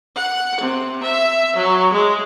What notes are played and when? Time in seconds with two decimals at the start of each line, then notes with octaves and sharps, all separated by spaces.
0.16 F#5
0.61 C3
1.04 E5
1.56 F#3
1.93 G#3